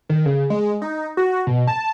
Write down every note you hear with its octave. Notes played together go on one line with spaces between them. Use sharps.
D#3
C#3
G#3
D#4
F#4
B2
A5